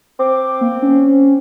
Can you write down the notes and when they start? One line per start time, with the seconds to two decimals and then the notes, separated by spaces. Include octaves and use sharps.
0.19 C4 D6
0.61 A#3
0.82 C#4